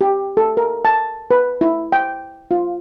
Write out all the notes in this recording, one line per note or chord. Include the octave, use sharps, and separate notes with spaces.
G4
A4
A#4
A5
B4
E4
G5
F4